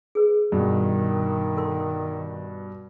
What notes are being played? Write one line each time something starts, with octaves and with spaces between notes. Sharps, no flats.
G#4 B4
G2 B2 D#3
A4 A#4 C6